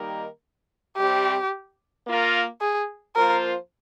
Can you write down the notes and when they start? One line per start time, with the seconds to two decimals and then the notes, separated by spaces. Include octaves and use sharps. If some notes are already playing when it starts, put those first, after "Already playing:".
Already playing: D#3 G3 A#3 D#4 A#4
0.97 C3 G3 C4 G4
2.07 A#3 F4 A#4
2.61 G#4
3.15 F3 A#3 F4 A#4 C5